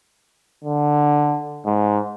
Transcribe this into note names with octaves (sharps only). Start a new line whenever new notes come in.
D3
G#2